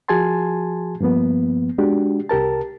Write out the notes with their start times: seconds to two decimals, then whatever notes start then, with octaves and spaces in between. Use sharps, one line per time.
0.08 F3 F#4 G#4 G#5 A5 C6
1.01 G2 F3 A#3 B3
1.78 G#3 D4 F#4 G4
2.29 C2 G4 A#4 A5